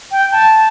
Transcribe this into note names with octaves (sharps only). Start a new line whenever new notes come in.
G5
A5